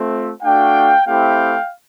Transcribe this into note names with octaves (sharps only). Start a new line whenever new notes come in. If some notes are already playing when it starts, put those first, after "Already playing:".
Already playing: A3 C4 F4
A3 D4 F#4 F5 G5
A3 C4 E4 G4 F5 G5